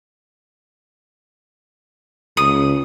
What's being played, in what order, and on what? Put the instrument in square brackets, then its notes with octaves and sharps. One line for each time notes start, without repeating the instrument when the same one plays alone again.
[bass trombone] C#2 [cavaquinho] D#6